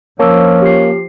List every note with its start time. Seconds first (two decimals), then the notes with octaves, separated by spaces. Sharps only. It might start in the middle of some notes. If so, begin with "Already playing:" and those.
0.20 F3 A#3 C#4 A5 E6
0.62 G4 C7